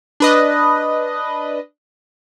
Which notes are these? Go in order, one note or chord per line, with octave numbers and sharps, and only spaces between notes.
D4 B4 D#5